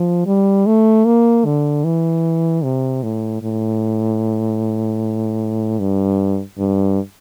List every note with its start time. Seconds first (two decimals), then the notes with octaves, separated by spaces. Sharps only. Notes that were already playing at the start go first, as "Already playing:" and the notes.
Already playing: F3
0.26 G3
0.66 A3
1.06 A#3
1.45 D3
1.85 E3
2.64 C3
3.03 A2
3.42 A2
5.80 G2
6.58 G2